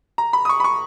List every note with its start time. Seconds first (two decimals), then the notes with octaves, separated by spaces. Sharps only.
0.18 A#5
0.33 B5
0.45 D#6
0.49 C#6
0.60 B5
0.64 C#6